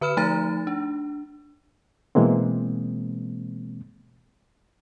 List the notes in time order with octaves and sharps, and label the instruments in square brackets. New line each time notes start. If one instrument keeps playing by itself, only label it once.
[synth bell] D3 B4 B5 F6 E7
F3 A3 D#4 A#5 A6
D4
[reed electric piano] B2 E3 G#3 A#3 C4